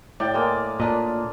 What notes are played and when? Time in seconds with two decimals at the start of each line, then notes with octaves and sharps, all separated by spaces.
0.20 A2 D5 G5
0.34 G#3 A#3
0.80 A#2 D4 D#5